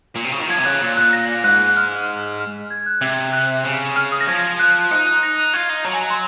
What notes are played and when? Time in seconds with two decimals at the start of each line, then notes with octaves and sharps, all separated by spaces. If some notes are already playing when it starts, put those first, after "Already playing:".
0.16 A#2
0.25 C3
0.33 C#3
0.42 D#3
0.50 F3 G#6
0.60 C3
0.65 C#3 F#6
0.81 A#2 F#6
0.97 F#6
1.13 A#6
1.44 G#2 F#6
1.60 F#6
1.77 F6
2.39 F6
2.70 G#6
2.86 F#6
3.01 C3 G#6
3.33 F#6
3.65 C#3
3.96 F6
4.12 D#6
4.21 A#6
4.28 F3 G#6
4.59 F#6
4.91 D#4 F#6
5.07 F#6
5.23 A#6
5.39 F#6
5.54 F4 G#6
5.69 D#4
5.85 F#3 A#5
5.93 G#5
6.01 A#5
6.10 C6